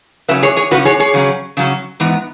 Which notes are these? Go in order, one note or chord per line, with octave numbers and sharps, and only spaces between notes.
C#3 F#3 C#4 B4 E5
G#4 C#5
G#4 C#5
C#3 F#3 C#4 F#4 B4
G#4 C#5
G#4 C#5
C#3 F#3 C#4
C#3 F#3 C#4
G#2 E3 B3